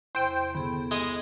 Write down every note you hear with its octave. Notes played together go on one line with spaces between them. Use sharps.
E2 C3 C5 G5
G1 B3 G#4 A4
G#3 D#6